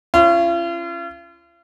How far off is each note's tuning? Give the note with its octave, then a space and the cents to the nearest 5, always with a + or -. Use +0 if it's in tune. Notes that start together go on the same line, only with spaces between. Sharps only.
C#4 -10 F4 -40